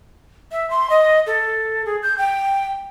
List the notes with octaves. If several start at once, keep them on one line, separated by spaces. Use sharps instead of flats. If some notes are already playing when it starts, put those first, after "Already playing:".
E5
C6
D#5
A4
G#4
G6
G5